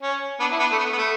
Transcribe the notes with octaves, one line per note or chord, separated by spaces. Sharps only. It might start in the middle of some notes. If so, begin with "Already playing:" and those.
C#4
B3 D4
E4
B3 D4
A3
B3
B3
A3